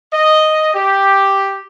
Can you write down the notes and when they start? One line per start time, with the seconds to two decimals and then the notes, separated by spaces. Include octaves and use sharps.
0.13 D#5
0.74 G4